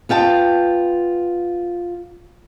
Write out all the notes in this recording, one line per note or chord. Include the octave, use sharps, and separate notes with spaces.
B3 F4 G5 A5